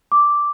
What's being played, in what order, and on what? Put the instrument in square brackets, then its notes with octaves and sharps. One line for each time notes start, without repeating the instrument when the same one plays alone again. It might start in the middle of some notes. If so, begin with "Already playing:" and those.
[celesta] D6